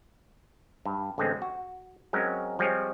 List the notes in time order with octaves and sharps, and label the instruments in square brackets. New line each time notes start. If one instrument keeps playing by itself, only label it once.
[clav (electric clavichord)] G2
A1 D3 G#3 C4
F#4
F#3 G#3 C4 C#4 A#4
F3 G3 G#3 C4 G#4 C#5